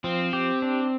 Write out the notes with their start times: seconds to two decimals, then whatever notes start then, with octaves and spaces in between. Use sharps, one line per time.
0.04 F3 C4
0.33 G4
0.62 D4